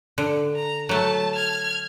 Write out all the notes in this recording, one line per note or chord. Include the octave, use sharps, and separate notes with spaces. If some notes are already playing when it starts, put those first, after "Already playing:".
D3
A#5
F#3 A3 A5
F6 G#6